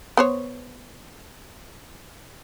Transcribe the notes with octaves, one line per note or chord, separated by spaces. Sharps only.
B3 C5 C#5